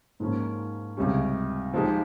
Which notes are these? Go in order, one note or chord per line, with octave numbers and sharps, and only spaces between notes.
G#2 F3 A#3 C#4
C#2 C3 G3 C#4
F3 G#3 D#4 G4